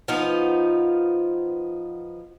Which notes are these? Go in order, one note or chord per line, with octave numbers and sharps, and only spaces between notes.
F3 B3 D#4 F4